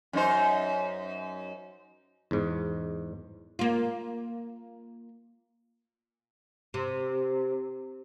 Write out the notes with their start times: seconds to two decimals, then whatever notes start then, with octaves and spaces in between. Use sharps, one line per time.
0.13 F#2 D#4 C5
2.31 E2 G#2
3.59 A#3 F4
6.74 C3